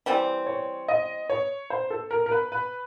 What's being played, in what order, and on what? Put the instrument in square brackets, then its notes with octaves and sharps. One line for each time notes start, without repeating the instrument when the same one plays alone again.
[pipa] E3 G3 C4
[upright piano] C#5
D#5
C#5
C5
A4
A#4
A#4
B4
B4